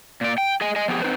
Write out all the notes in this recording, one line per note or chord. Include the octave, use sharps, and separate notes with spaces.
A#2 D5
G5
G#4 D#5 G#5
D#5 G#5
F3 B3 G4 G#4
C4 D#4 B4 C5